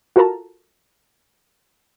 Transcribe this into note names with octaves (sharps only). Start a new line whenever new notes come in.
F4 F#4 A4 A#4 A5 A#5